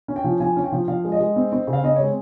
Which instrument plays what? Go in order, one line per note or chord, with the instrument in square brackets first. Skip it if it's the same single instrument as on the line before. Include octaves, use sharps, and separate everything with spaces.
[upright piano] C#4
G5
F3
F3 G#5
C#4
G5
F3
F3 F5
G#3
D#5
G#3
C4
C4
C#3
F5
C4 D#5
G#3 C#5